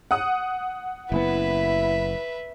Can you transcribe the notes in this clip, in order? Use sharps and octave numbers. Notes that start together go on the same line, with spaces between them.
F#5 D#6
F#1 B3 E4 B4 E5